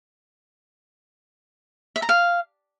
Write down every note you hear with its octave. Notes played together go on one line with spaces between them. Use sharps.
E5
A#5
F5